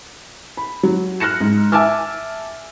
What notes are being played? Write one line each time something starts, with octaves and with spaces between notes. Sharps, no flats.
B5
F#3
F6 F#6 A#6 C#7 E7
G#2
E5 G#5 A5 D6 E6 F6